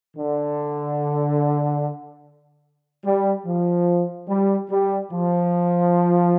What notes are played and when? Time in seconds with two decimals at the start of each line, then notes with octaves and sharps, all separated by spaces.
0.16 D3
3.05 G3
3.46 F3
4.29 G3
4.70 G3
5.12 F3